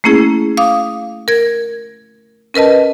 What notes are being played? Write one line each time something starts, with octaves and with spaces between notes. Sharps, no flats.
A3 A#3 C#4 E4 G#4
F5 D6 D#6
A#4 G#6
C#4 A#4 B4 D#5 A5